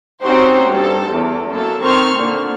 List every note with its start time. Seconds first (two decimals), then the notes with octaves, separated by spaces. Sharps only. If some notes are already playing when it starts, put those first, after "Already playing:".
0.23 C4 C#4 D#4 F#4 G4 C5
0.71 G2 A4
1.10 E2
1.51 F#2 A#3 A4
1.81 D#3 C4 C5 C#6 F6
2.16 A#2 D3